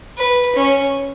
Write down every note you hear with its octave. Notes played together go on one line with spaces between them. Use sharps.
B4
C#4